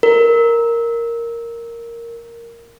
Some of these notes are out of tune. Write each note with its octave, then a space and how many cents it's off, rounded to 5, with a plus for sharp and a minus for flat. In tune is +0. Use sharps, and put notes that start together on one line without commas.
A#4 -5